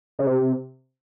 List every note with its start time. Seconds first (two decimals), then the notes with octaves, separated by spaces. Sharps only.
0.19 C#3
0.26 C3